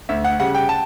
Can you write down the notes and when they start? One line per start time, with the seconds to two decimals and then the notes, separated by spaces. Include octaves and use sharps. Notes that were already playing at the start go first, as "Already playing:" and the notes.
0.09 D2 E5
0.24 F#5
0.39 C#3 G3 F#5
0.55 G5
0.69 A5